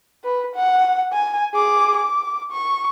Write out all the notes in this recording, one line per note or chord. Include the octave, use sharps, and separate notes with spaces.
B4
F#5
G#5
G#4 D6
D6
C#6